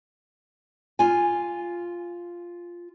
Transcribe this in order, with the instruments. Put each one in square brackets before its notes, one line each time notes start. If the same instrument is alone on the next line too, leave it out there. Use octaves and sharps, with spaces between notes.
[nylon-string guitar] F4 G#5